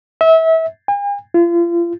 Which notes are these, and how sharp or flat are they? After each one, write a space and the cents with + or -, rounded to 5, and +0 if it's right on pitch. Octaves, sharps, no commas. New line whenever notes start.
E5 -30
G#5 -45
F4 -35